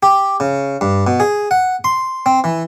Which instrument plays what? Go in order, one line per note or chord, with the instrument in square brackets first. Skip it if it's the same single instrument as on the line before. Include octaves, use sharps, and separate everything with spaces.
[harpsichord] G4
C#3
G2
B2
G#4
F#5
C6
C4
E3